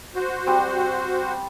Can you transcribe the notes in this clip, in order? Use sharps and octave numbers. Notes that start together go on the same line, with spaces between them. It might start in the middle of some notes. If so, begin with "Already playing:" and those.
F#4 C5
G3 C4